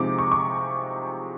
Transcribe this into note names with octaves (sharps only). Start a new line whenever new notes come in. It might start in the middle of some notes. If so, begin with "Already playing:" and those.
Already playing: C3 F3 G#3 C4 D#4 D6
C#6
C#6